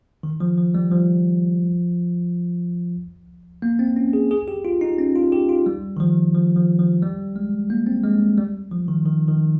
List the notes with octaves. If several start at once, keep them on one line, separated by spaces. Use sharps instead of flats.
D#3
F3
F3
G3
F3
A#3
C4
C#4
G#4
G#4
G4
F4
D#4
C#4
F4
G4
F4
G3
D#3
F3
F3
F3
F3
G3
G#3
A#3
C4
G#3
G3
F3
D#3
D#3
D#3